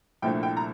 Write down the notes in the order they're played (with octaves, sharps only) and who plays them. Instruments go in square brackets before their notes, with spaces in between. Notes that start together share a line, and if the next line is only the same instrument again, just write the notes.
[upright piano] C2 A#2 F3 A3 D4 G5
G5
A#5